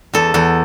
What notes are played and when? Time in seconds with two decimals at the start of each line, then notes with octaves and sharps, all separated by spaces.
0.13 E2 A4
0.34 E2 A4